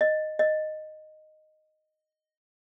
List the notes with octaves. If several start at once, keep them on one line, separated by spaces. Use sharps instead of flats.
D#5
D#5